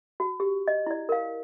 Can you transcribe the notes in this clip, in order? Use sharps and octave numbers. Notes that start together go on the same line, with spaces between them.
F#4
G4
D#5
E4 D5
A#4 F5